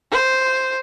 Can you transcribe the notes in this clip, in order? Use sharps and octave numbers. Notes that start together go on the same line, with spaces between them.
C5